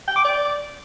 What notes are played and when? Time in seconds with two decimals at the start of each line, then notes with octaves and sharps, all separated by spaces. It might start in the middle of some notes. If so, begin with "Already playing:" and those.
0.08 G5
0.16 D6
0.24 D5